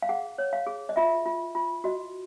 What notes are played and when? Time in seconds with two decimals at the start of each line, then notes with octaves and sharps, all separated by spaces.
0.02 F5
0.09 G#4 F#5
0.38 C#5
0.53 F5
0.67 G#4
0.89 D#5
0.96 F4 E5
1.26 F4
1.55 F4
1.84 F#4 D#5